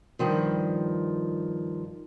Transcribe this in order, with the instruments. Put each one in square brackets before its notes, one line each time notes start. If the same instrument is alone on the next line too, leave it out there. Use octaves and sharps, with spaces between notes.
[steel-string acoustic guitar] G2 D#3 F3